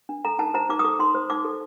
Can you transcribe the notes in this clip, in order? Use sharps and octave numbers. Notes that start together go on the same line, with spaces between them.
D4
A4 A#5
D#4 A5
C5 A#5
D#4 D6
D#6
A4 D6
D#4 C6
C5
D#4 D6
A4